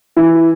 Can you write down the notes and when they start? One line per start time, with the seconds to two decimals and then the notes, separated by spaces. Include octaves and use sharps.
0.17 E3